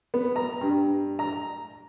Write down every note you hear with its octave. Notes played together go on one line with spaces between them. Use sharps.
B3
A#5
G2
A#5